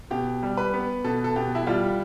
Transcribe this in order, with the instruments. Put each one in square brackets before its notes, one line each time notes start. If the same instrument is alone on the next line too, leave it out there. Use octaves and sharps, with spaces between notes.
[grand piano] B2 [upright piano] G4
[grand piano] G3
[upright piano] B4
[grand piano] B3
[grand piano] B2 [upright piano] A4
[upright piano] A4
[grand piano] B2 [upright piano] G4
[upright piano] E4
[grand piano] G3 [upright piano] F4